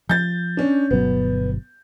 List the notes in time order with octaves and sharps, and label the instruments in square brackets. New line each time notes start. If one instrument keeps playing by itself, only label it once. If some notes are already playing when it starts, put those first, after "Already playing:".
[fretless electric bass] F3 [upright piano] G6 A6
[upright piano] C#4 D4
[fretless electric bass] G1 B2 F#3 [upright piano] B3